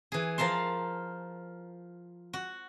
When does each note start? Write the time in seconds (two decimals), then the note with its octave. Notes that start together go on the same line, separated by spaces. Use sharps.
0.12 E3 G#4
0.38 F3 A#4 F5 A5 C6
2.33 F#4